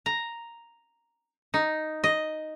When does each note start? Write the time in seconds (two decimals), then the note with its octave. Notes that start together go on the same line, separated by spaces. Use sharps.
0.06 A#5
1.54 D#4
2.04 D#5